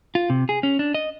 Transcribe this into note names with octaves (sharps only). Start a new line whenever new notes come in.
F4
C3
G#4
C#4
D4
D#5